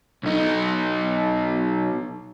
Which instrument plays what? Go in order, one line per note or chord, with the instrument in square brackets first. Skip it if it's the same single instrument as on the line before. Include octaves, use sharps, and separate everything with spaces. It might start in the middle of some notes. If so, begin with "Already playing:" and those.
[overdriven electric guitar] B1 D#4